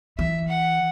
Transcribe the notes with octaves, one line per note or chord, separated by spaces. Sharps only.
E3 E5
F#5